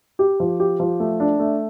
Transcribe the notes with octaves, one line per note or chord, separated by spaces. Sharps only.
G4
F3
G4
F3
A3
D4
A3